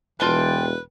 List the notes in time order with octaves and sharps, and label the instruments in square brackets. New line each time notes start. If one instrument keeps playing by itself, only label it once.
[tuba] E1 [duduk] E3 [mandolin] F4 G5 A5 [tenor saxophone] B4